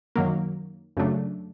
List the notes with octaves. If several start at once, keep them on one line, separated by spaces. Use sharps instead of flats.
F#2 D#3 F#3 A#3
F#2 C#3 F#3 A3 D4